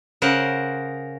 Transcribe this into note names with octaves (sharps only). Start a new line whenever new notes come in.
C#3 A#4 C5 F#5